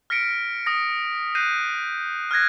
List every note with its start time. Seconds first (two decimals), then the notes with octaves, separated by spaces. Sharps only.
0.10 F6 A#6 B6 C#7 D7
0.66 D#6 A#6
1.35 F#6 G6 A#6 C7 D#7
2.31 F6 F#6 G#6 A#6